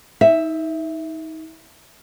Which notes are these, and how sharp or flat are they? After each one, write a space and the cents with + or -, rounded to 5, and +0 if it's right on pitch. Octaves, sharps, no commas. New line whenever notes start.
D#4 +35 E5 +0